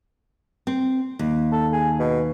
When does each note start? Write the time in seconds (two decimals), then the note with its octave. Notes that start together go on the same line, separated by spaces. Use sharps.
0.67 C4
1.19 D#2
1.52 A4
1.73 G#4
1.99 B2